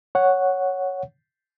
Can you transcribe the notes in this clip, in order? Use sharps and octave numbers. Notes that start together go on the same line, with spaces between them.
C#5 F#5